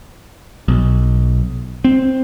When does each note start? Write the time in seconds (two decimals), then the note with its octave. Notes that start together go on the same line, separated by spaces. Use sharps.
0.68 B1
1.84 C4